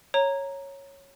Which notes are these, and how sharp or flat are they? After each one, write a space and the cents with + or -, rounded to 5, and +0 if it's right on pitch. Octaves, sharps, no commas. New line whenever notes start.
C#5 -5 A#5 +0